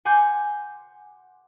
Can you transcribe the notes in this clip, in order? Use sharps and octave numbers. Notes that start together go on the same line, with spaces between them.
F#5 G#5 C6 D6 G6